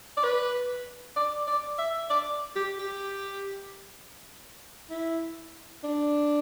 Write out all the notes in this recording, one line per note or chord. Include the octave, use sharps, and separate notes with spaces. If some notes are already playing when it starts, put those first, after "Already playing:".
D5
B4
D5
D5
E5
D5
G4
G4
E4
D4